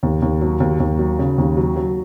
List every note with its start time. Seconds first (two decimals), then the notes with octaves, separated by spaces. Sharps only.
0.03 D#2
0.22 D#2
0.41 F#3
0.60 D#2
0.80 D#2
0.99 F#3
1.19 C#3
1.38 D#2
1.57 F#3
1.76 F#3